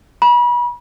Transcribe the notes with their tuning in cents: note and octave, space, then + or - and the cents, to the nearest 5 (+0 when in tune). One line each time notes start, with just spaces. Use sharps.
B5 -35